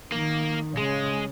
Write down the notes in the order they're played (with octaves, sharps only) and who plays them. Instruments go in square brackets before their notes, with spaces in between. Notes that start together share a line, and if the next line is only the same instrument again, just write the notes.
[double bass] D#3 [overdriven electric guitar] A#3
[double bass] C#3 [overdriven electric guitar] G#3